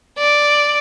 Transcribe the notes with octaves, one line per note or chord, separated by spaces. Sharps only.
D5